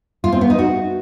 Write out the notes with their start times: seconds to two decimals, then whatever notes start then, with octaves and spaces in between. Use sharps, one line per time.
0.24 F4
0.32 C4
0.41 B3
0.50 D#4
0.59 F#4